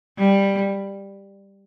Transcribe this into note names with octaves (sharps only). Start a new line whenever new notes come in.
G3